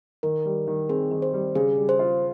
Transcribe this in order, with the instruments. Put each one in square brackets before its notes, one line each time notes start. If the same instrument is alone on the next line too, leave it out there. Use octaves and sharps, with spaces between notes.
[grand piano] D#3 [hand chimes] A#4
[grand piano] G3
D#3
[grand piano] C4 [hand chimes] G#4
[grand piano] D#3
[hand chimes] C5
[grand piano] G3
[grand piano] C#3 [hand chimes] G#4
[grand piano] G3
[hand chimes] C5
[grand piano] F4